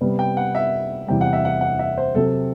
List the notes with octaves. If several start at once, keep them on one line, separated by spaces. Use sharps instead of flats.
C3 G3 B3
G5
F#5
E5
E2 C3 G3 G5
F#5
E5
F#5
F#5
E5
C5
C3 F#3 C4 A4